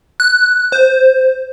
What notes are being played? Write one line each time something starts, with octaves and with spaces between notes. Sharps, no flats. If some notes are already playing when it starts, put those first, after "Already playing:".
F#6
C5